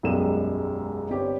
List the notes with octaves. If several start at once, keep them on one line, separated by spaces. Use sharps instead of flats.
E1 B1 F#2 G3 G#3 E7
G1 G3 C4 G4 C#5